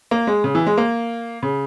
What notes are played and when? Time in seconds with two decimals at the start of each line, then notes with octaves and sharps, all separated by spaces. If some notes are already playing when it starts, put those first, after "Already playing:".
0.11 A#3
0.27 G#3
0.44 C#3
0.55 E3
0.66 G#3
0.78 A#3
1.43 C#3